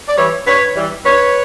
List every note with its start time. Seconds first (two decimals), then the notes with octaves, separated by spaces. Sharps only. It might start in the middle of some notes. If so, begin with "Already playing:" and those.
0.08 D5
0.17 E3 G3 B4 C#5
0.46 G2 B4 C#5
0.76 E3 G3
1.05 G2 B4 C#5